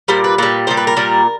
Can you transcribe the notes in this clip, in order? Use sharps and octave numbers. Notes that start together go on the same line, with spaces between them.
A#2 G3 C5
B4
A#2 G3 B4
A#2 G3 C5
B4
A#4
A#2 G3